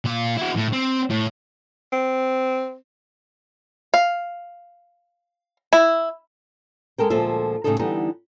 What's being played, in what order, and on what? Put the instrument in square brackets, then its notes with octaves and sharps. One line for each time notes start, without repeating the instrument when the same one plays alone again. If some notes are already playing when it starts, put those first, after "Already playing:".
[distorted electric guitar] A#2 F5
E4 F#4
A2
C4
A2
[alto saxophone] C4
[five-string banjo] F5
E4
[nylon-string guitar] G#3 A4 A#4 G5
D2 A#2 F3 G#3 A4 E5
A2 C#3 F3 G3 D#4 A4
D3 E3 G3 B3 D#4